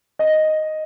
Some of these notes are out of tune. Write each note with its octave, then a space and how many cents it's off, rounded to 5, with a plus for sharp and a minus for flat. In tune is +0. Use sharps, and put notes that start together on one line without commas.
D#5 +0